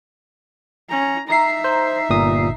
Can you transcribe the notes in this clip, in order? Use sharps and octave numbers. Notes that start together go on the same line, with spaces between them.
C#4 A#5
D#4 E5 A#5 C7
C5
G1 A#2 D#6